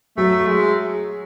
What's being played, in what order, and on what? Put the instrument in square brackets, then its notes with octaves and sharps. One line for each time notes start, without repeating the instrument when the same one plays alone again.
[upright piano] F#3 [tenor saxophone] A3
[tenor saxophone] G#3